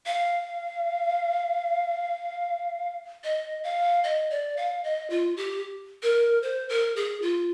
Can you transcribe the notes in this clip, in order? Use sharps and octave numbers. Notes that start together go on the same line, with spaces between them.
F5
D#5
F5
D#5
D5
F5
D#5
F4
G4
A#4
C5
A#4
G#4
F4